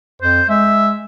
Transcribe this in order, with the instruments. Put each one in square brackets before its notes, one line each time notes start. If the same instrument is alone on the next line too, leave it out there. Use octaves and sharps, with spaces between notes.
[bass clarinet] F2 [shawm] C5
[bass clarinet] G#3 [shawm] E5